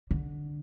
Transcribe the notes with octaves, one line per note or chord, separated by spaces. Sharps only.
D3